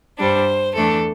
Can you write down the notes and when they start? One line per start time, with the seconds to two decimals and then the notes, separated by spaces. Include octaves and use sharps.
0.18 G2 G3 D4 C5
0.74 E2 E3 A3 D4 A4